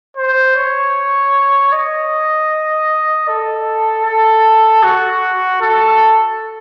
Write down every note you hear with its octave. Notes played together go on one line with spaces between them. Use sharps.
C5
C#5
D#5
A4
A4
F#4
A4